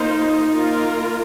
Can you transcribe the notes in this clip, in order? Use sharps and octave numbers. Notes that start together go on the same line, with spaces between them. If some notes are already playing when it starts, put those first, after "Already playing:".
Already playing: A#3 D#4 F4 C5
A#3 F4 A#4